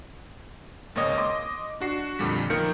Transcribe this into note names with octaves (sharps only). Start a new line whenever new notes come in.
G#1 C#2 A#3 C#5 D#5
D#5 C6 D6
D4 F#4 C7
F2 A#2 D3 G3 B6
D#3 F3 A#3 A#4 G6 C#7